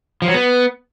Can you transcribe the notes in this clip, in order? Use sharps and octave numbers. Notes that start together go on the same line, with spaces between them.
F3
F#3
B3